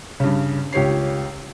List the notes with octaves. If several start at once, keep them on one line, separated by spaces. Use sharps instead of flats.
G2 C#3
C#2 G4 C#5 C7